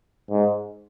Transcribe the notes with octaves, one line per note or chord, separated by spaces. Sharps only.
G#2